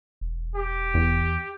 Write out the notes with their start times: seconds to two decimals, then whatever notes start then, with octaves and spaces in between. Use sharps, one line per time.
0.21 E1
0.55 G4
0.94 E2